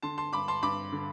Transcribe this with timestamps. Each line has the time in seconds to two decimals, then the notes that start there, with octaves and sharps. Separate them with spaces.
0.03 D3 A5 C6
0.18 A5 C6
0.33 G2 B5 D6
0.48 A5 C6
0.63 G2 B5 D6
0.93 D3